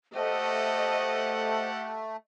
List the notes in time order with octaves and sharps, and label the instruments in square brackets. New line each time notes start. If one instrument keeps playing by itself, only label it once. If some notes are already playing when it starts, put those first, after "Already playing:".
[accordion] A3 [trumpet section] G4 A4 F#5 [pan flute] C5 [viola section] D#5